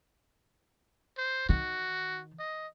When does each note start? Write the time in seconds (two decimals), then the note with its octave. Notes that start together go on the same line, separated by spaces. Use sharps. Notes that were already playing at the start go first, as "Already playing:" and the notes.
1.18 C5
1.49 D#3 F#4
2.39 D#5